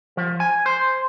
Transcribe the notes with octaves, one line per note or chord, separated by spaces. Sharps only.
F3
G#5
C5